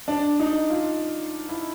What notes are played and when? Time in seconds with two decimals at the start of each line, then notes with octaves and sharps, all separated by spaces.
0.08 D4
0.40 D#4
0.70 F4
1.49 E4